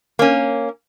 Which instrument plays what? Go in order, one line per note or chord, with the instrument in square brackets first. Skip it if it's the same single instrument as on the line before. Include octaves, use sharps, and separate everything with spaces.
[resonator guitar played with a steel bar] A#3 C#4